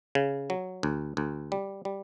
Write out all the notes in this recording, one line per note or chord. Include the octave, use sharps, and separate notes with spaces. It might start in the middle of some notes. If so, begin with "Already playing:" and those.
C#3
F#3
D2
D2
G3
G3